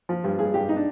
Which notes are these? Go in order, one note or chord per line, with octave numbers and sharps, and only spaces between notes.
F3
G2
G2 G#4
G2 G4
D#4
D4